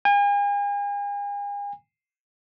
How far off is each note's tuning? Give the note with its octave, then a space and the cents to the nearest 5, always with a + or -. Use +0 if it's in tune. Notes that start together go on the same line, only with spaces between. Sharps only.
G#5 -40